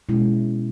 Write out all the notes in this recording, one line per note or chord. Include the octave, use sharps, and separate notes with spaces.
B2 G#3 C#4 E4